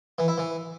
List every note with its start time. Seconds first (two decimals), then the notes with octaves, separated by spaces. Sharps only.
0.18 E3
0.28 E4
0.38 E3